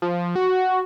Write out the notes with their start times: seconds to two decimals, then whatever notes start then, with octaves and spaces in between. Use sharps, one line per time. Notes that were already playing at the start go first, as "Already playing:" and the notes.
0.02 F3
0.35 F#4